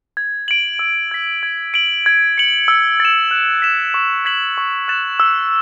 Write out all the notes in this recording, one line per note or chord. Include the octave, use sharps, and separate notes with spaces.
G#6
D7 F#7
E6
G#6 B6
G#6
D7 F#7
G#6
C#7 F#7
E6
A6 E7
F#6
B6 E7
C#6
G#6 B6 F#7
C#6
F#6 A6 E7
E6